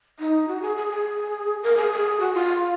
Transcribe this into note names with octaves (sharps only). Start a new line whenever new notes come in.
D#4
F#4
G#4
G#4
G#4
A#4
G#4
G#4
F#4
F4